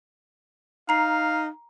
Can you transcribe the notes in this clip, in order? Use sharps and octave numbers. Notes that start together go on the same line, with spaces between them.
D#4 F5 A#5 C7